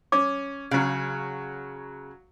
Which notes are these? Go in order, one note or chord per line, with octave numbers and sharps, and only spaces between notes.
C#4 D6
C#3 F#3 F5